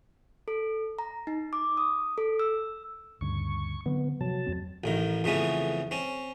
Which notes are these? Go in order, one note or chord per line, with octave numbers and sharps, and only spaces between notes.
A4
A#5
D#4
D6
D#6
A4
E6
D2 G2 C#3 C#6
D3 F#3 B3 C4
C3 F3 F#3 A5
F2 C4
A1 A2 D#3
F2 C#3 E3 A3 B3 C#4
C4 C#4